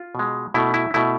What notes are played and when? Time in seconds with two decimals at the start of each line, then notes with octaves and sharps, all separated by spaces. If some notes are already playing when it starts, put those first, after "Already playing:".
Already playing: F4
0.15 B2 G#3
0.54 B2 A3 E4
0.74 E4
0.94 B2 A3 E4